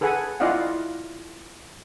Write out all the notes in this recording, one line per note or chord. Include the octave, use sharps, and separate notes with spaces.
G#4 A4 B4 F#5 G#5
E4 F4 D5 D#5 F5 F#5